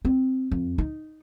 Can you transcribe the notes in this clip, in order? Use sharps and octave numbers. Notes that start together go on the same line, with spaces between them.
C4
F2
D#4